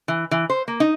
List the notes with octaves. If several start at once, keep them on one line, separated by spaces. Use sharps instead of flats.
E3
E3
C5
A#3
D#4